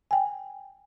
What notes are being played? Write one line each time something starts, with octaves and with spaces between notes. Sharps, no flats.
G5 G#5